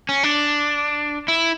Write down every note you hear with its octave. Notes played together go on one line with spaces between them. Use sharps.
C#4
D4
E4